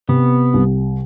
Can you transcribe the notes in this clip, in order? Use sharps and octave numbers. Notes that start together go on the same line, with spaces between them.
C3 B3
C2